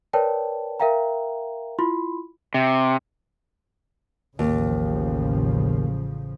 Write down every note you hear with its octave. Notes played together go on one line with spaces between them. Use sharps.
A#4 B4 C#5 D5 G5 A5
A#4 E5 F5 G5 A#5
E4 F4 B5 C6
C3
A1 D#2 C#3 F3